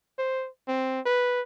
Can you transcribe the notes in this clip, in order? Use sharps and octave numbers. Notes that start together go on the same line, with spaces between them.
C5
C4
B4